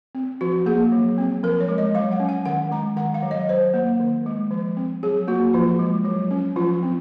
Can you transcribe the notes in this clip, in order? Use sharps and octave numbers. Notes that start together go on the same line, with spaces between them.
C4
F3 F#4
A#3 G#4
F#3
C4
F3 A#4
C#5
G#3
D#5
F#3 F5
F#5
C#4
G#5
D#3 F#5
G#3 A#5
D#3 F#5
F5
F#3
D#5
F#3 C5
A#3
D#3
G#3
F3
C4
F#3 G#4
A#3 F#4
F3 F4
G#3
F#3
C#4
F3 F4
C4